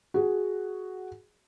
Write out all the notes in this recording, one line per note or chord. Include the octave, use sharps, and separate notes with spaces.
F#4 G#4